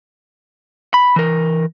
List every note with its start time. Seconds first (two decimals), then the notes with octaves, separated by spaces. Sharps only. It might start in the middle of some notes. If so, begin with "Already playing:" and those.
0.94 B5
1.16 E3 A#4